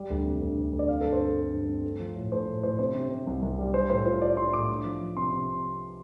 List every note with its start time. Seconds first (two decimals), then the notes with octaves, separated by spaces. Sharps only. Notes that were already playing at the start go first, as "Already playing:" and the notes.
Already playing: G3
0.10 D2
0.25 C3
0.41 D2
0.57 D2
0.73 D2
0.79 D5
0.89 C4 F5
1.01 G2 A4
1.12 C5
1.21 C4 A4
1.37 C4
1.52 G2
1.69 C4
1.84 A3
2.00 F3
2.16 A2
2.32 A3 C5
2.47 A2
2.63 A2 C5
2.79 C3 C5
2.95 C3
3.11 C3
3.27 C2
3.42 C2
3.59 G3
3.74 G3 C5
3.90 A2 C5
4.06 F4 C5
4.21 F4 D5
4.37 F4 C6
4.53 A2 D6
4.69 D4
4.85 F3
5.01 F3
5.17 C3 C6
5.32 C3